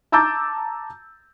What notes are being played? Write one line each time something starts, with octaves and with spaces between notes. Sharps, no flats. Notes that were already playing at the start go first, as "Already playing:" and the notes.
A5 A#5 D6 E6 G6 A6